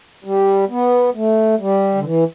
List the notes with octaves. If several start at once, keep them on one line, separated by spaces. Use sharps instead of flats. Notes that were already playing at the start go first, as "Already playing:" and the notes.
G3
B3
A3
G3
D3
E3